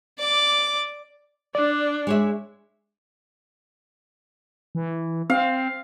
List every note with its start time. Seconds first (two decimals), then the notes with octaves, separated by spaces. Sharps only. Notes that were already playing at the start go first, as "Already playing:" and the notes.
0.19 D5 D6
1.55 D4 D5
2.07 G#3 C#5 E5
4.75 E3
5.30 C4 F5